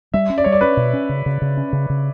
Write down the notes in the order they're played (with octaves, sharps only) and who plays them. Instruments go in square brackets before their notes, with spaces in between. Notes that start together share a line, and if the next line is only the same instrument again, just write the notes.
[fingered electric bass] G3 [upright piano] E5
[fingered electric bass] C#4
[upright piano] D5
[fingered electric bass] G3 [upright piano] C#5
[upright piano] D5
[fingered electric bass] C#4 [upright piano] B4
[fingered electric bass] B2
C#4
C#3
C#3
C#3
C#4
C#3
C#3